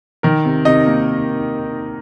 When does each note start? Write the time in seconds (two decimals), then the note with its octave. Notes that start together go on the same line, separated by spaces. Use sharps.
0.23 D#3 A#4
0.45 C3
0.65 C3 D#4 D#5
0.86 A#3